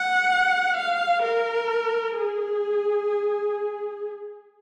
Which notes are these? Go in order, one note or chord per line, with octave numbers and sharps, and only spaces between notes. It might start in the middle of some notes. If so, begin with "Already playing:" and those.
Already playing: F#5
F5
A#4
G#4